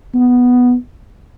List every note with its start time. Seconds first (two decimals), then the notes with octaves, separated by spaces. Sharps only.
0.14 B3